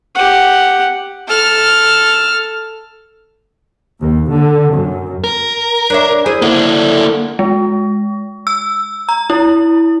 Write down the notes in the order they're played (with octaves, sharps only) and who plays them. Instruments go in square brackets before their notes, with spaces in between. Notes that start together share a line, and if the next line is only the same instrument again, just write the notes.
[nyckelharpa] G4 F#5
[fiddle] A4 F6
[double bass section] D#2
D3
F#2
[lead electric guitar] A#4
[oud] D4 C#5 E5
E4 G#4 C5
[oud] D3 [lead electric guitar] A#3 E4
[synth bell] G#3
E6
A#5
E4